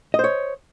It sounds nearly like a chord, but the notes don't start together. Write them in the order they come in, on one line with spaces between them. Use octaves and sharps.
D#5 C5 C#5